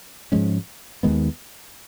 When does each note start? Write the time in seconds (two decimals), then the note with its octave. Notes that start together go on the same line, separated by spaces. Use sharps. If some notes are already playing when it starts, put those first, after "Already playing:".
0.32 G#2 F3 G#3 C#4
1.03 D#2 D#3 G#3 B3